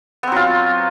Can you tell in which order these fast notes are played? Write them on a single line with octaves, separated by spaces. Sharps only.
B3 C4 F#3 F4